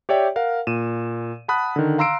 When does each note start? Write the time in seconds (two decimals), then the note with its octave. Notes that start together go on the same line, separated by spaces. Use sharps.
0.09 G4 C#5 D5 E5 G5
0.36 A#4 F5 F#5
0.67 A#2 D#7 E7
1.48 F#5 A5 B5 D#6 F#6
1.76 D3 D#3
1.98 F5 A#5 C6 E6 C7 D7